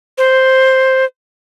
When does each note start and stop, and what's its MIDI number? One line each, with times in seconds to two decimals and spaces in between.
0.18 1.05 72